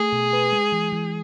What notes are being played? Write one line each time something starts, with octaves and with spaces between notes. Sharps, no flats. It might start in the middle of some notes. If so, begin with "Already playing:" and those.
Already playing: A3 G#4
B2
B4
G#3
E3
E3